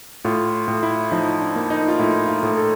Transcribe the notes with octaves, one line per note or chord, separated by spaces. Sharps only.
A2 F4
A2
E4
F3 D#4
D4
A#3
D#4
F4
A2 E4
F4
A2
A4